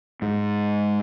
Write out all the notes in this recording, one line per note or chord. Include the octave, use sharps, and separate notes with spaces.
G#2